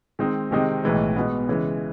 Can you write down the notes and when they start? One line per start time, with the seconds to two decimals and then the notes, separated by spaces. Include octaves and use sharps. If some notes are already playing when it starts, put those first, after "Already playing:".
0.19 D#3 G#3 C4 D#4
0.51 C3 D#3 G#3 C4 D#4
0.83 B1 A2 E3 G#3
1.16 B2 G#3 B3
1.48 C#3 E3 G#3